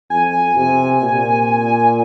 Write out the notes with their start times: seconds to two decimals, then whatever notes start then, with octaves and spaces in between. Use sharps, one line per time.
0.10 F2 G#5
0.56 C3
1.02 A#2